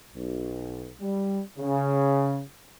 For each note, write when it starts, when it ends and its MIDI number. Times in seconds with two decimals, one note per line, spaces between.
0.14 0.92 35
1.00 1.40 55
1.58 2.41 49